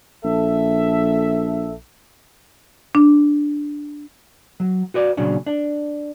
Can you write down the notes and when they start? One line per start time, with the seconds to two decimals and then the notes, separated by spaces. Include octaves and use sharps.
0.24 A#1 A4 E5
2.95 D4
4.60 F#3
4.94 F#4 B4 D5
5.17 A#2 C#3 F#3 D4
5.47 D4